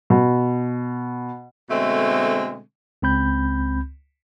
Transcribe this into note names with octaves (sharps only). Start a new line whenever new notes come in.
B2
B2 D3 G#3 A3 C4
C#2 C4 B5 G6